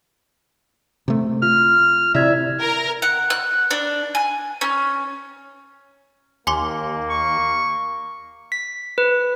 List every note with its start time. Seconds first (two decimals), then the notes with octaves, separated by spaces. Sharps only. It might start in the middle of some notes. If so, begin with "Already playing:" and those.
1.08 C3 A3
1.42 F4 F6
2.15 C3 E4 D5 E5 G#6
2.62 A#4
3.02 F#5
3.30 F#6
3.71 D4
4.15 G#5
4.61 C#4
6.47 D#2 A#3 G#5 C6 D6
7.10 C#6
8.52 B6
8.98 B4